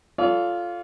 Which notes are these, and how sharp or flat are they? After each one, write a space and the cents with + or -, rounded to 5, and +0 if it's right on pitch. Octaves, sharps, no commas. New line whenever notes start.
F4 +0 A4 +0 D5 -45